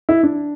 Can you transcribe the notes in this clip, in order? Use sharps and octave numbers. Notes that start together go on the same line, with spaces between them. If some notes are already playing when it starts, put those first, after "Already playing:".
E4
D4